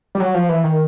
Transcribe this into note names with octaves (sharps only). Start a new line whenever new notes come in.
G3
F#3
F3
E3
D#3